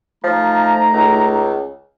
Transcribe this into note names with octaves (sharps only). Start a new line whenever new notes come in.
F3 A3 D#4 A#5
C#2